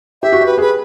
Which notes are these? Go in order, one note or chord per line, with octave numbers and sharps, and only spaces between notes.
G4 E5
F#4
G4
B4
G#4 B4